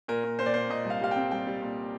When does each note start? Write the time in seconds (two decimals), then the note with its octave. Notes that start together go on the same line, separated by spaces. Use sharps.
0.08 A#2 A#4
0.24 A#2
0.39 A#2 C5
0.46 D5
0.54 A#2 C5
0.70 A#2 D#5
0.85 C2
0.90 F5
1.01 G3 F5
1.11 C4 G5
1.31 G3 G5
1.47 G3
1.62 A#2